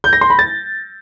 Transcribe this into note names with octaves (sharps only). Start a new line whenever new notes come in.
G6
A#6
C6
B5
A6